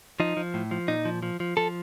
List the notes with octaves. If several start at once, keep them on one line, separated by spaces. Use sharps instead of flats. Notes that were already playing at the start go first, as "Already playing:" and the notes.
F3 D#4
F3
A2
F3
A#2 D#4
F3
F3
F3
F3 A4